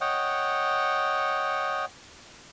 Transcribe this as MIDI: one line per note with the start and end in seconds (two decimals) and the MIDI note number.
0.01 1.85 73
0.01 1.85 75
0.01 1.85 78
0.01 1.85 79